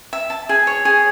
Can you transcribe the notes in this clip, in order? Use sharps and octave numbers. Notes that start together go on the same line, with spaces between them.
E5
A5
G#4
C#5
G#4